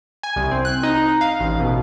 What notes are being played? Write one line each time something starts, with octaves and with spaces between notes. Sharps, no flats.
G#5
C2
C4
F#6
D#4
F5
A1
B2